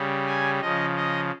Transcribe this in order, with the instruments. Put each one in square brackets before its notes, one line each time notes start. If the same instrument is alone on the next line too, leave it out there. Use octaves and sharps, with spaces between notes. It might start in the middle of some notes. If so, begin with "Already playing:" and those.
Already playing: [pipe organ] C#3 G3
G#5
C#3 F3 D#5
D#5